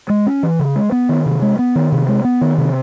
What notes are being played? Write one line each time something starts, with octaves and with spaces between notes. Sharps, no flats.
G#3
C#4
E3
C#3
G#3
B3
D#3
C3
G#3
B3
D#3
C3
G#3
B3
D#3
C3